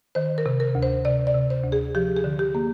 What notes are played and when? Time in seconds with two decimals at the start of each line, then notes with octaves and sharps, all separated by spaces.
0.15 D#3 C5
0.38 A#4
0.46 C3
0.60 A#4
0.75 D2
0.83 C5
1.05 C3 D5
1.27 D5
1.34 C3
1.50 C5
1.64 D2
1.72 G#4
1.95 F3 G4
2.17 G#4
2.24 D3
2.39 G4
2.55 A#3